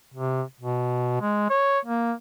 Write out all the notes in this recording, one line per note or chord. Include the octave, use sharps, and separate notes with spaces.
C3
B2
G#3
C#5
A#3